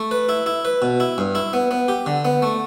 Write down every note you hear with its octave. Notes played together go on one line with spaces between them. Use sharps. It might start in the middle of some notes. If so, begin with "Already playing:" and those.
Already playing: A3
B4
E4
E4
B4
B2
E4
G2
E4
B3
B3
G4
D3
B3
A3